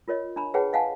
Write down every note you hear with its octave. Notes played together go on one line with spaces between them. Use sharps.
F4 A#4 C#5 D#5
D4 A#5 B5
G#4 B4 C#5 F#5 G5 A5
D#5 F5 F#5 G#5 A5